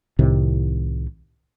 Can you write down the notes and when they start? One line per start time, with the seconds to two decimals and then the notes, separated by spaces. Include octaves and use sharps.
0.19 C2 A2 C3 D#3